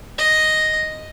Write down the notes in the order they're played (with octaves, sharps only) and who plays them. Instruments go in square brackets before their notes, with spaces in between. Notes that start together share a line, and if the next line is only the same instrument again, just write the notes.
[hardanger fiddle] D#5